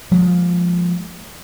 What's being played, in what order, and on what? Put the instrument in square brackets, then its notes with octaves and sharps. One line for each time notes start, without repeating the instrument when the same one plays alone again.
[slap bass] F3 G#3 A#3